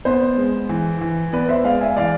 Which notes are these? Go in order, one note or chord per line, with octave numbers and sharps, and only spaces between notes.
B3 C5
G#3
E3
E3
B3 B4 D5
C5 E5
G#3 D5 F5
E5 G#5
E3 D5 F5